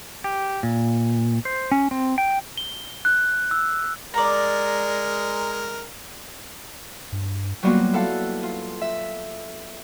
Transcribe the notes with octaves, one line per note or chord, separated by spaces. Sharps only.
G4
A#2
C5
C#4
C4
G5
G7
F#6
E6
G#3 A#4 D5 A#5
G2
F#3 G3 A#3 B3 F4 F#4
E4 A4 F5 F#5
F4
E5